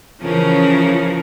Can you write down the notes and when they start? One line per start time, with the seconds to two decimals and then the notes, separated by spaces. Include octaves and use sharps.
0.22 C#3 E3 F3 C#4 A#4